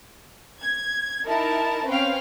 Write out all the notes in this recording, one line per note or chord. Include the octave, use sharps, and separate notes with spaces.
G#6
D#4 E4 A#4 A5
C4 C#4 B4 C#5 F5 G5